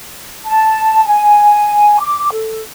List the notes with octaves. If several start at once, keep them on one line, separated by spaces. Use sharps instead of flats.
A5
G#5
D6
A4